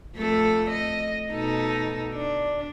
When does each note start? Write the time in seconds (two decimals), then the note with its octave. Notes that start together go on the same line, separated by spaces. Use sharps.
0.15 F2 A3 A4
0.70 D#5
1.31 B2 D#4 A4
2.13 D4